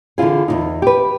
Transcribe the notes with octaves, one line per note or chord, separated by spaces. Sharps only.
D3 E3 E4 F4 G#4
E2 B2 D#4
G4 B4